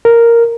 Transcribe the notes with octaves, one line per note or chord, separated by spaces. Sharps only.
A#4